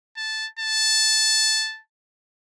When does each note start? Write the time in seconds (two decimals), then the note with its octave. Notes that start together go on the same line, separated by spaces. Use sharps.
0.17 A5
0.60 A5